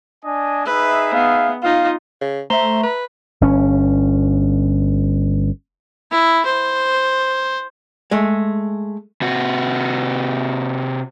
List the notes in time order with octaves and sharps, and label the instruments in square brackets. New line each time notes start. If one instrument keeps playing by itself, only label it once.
[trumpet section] D4 D#5 G#5
[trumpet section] D#4 G#4 E5 [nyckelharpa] B4
[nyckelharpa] B3 [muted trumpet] F5
[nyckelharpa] D#4 F4 [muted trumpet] F5
[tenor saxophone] C#3
[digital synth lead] A3 [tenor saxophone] C5 [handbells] E5 A#5
[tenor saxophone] B4
[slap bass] G1 C#4
[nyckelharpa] E4
C5
[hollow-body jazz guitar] G#3 A3
[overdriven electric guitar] C3 F#4